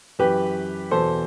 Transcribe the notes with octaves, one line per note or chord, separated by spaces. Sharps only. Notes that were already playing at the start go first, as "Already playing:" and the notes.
F#2 E3 G4 B4
E2 B2 A4 C5